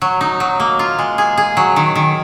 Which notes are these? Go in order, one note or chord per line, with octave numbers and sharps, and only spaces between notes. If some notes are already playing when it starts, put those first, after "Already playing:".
F#3
D#4
F#3
A#3
F4
G#3
G#4
G#4
F#3
D#3
D#3